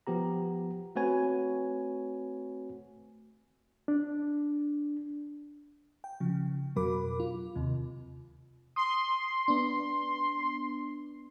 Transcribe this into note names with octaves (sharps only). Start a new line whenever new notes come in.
F3 B3 G4 A#5
A3 C4 F#4 B4 C#5 G#5
D4
G5
C#3 F3
F2 B2 F#3 A#4 B5 D6
F4
D#2 C3
C6 D#6
B3 D4